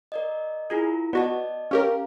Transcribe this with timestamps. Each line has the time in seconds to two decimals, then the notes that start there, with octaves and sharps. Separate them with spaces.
0.12 A#4 D5 D#5
0.70 E4 F4 G#4 A#4
1.13 B3 F#4 D5 D#5 A5
1.71 C#4 G4 A#4 F5